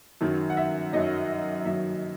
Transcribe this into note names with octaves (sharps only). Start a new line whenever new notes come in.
F#2 D#3 F#3
F#5
E5
F#2 D#3 F#3 D#5
F#2 D#3 F#3 E5